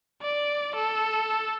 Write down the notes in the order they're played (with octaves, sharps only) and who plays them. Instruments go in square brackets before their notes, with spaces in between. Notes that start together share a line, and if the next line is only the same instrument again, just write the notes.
[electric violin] D5
A4